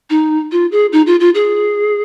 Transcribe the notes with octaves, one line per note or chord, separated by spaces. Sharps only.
D#4
F4
G#4
D#4
F4
F4
G#4